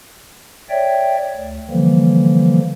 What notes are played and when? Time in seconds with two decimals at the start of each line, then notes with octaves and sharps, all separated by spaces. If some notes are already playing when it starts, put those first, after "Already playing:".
0.70 C#5 D5 E5 G5
1.35 D2
1.70 D3 E3 F3 G3 A#3